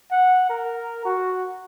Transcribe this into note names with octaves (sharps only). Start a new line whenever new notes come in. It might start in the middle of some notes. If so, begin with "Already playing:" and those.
F#5
A#4
F#4